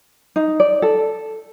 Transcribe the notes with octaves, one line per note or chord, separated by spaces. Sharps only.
D#4
D5
A4